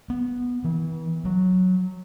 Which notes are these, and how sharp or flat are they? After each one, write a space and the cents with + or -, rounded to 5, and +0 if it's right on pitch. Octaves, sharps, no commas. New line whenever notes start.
B3 -5
E3 -35
F#3 -5